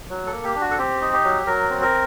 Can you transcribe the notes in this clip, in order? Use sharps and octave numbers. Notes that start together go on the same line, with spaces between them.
F#3
A4
A#3
G4
D4
F#4
A4
C4 G4
D#4
G4
F#3
F#3 A#4
C4
A#4